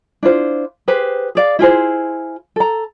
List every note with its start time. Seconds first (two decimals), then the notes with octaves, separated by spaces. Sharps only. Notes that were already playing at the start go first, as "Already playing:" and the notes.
0.23 D4 E4 F4 C5
0.88 G4 G#4 B4 C5
1.35 G#4 D5 F5
1.59 E4 F4 G#4 C5
2.56 A4 A#5